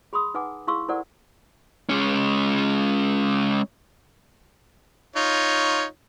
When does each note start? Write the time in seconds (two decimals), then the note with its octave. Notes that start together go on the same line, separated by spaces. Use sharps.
0.13 G#4 B5 C6 D#6
0.34 D#4 B4 F#5 G#5 D6
0.67 E4 G#4 F5 C6 C#6 E6
0.88 E4 A4 A#4 C5 D5 F#5
1.89 G#3 C#4
5.16 D#4 F4 C#5